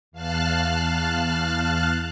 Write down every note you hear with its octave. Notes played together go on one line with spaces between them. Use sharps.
E2 F5 A5 F6 F#6